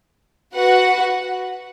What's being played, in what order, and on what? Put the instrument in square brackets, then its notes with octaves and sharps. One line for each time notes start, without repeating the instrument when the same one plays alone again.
[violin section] F#4 B4 F#5